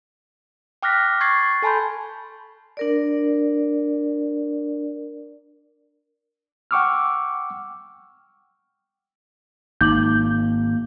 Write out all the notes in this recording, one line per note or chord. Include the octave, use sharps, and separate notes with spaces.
G5 D6 F6 F#6 A#6 B6
C#6 G#6 A6 C7
A4 G#5 A5 B5 C6 G6
D4 A#4 D5
F#5 G5 C#6 D6 E6 F6
G#1 A#3 D#4 D6 G6 F#7